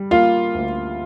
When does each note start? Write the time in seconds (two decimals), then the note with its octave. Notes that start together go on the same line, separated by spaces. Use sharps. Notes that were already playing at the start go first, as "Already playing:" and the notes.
Already playing: G3
0.11 A#3 F4 F5
0.54 D2